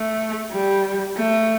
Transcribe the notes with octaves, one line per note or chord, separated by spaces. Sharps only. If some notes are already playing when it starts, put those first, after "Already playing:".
Already playing: A3
G3
A3